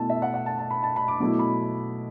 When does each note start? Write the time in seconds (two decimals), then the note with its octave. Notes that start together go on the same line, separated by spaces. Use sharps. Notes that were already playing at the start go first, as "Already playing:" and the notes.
Already playing: B2 A3 E4 A5
0.10 E5
0.22 F#5
0.34 F#5
0.46 A5
0.59 A5
0.71 B5
0.83 A5
0.96 B5
1.08 D6
1.20 B2 F#3 A3 E4 D6
1.39 B5